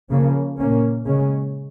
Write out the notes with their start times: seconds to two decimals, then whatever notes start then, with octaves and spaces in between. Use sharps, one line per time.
0.10 C#3 F3 A#3 C#4
0.59 A#2 A#3 C#4
1.06 C#3 G#3 C#4